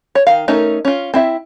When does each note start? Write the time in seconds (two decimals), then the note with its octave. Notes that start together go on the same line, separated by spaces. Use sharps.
0.15 C#5
0.27 D#3 F5
0.48 A3 C#4 D#4 A#4
0.85 C#4 F4
1.14 C4 E4 E5